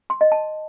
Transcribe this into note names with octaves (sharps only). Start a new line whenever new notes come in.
C6
D#5
A5